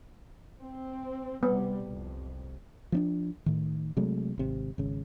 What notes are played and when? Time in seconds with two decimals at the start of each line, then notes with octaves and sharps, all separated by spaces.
0.59 C4
1.43 C3 G3 B3
1.85 C2 F2
2.92 F3 C#4 D4
3.46 A2 D#3
3.97 C3 F#3 G#3 A3
4.38 G#1 C3
4.78 G#1 C#3